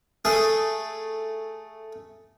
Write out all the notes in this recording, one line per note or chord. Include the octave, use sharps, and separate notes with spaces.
A3 G#4